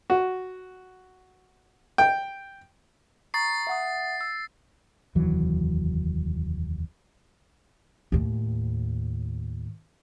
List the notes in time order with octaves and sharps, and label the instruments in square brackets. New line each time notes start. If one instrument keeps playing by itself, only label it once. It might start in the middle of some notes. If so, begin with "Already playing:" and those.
[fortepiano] F#4
G5
[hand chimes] A#5 C#6 D#6 [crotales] A6 C7
[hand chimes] E5 F#5 D#6
E6
[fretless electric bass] F1 D#2 E3 F#3
[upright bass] D#2 A2